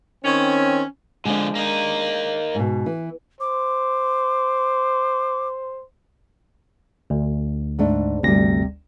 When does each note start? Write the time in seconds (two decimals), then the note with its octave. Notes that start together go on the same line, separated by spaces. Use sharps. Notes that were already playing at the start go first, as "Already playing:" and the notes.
0.24 D#3 C4 C#4
1.25 D3 F3 G#3 D4
1.55 A#3 D#4
2.55 G#2 B2
2.86 E3
3.41 C5 D6
7.10 D2
7.79 G#2 A3 D4
8.23 G1 D2 C3 G3 A#6